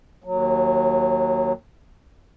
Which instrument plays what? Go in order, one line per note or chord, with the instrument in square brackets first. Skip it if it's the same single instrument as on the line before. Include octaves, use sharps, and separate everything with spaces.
[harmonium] D#2 F#3